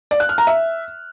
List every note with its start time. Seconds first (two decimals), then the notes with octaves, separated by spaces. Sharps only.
0.11 D5
0.20 F#6
0.29 F6
0.38 A#5
0.47 E5